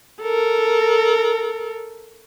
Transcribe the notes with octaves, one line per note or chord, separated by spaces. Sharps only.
A4 A#4